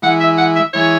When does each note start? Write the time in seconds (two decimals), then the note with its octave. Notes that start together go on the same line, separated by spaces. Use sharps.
0.02 E3 G#3 E4 F#5
0.21 E5
0.38 F#5
0.56 E5
0.73 E3 G#3 E4 C#5